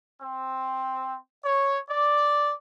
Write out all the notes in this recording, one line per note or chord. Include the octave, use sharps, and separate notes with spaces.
C4
C#5
D5